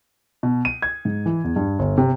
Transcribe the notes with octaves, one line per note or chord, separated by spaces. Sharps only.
B2
D#7
G#6
G#2
E3
E2
G2
G1
C3